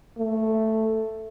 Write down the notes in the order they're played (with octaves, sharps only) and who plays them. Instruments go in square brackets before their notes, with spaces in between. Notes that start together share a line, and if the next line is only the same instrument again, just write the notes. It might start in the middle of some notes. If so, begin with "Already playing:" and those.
[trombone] A3